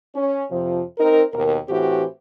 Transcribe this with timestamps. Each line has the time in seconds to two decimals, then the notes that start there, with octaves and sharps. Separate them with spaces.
0.15 C#4
0.51 F2 C3 F3
0.98 C4 D#4 A#4
1.33 D#2 B2 A#4
1.68 A2 E3 C4 F#4 G4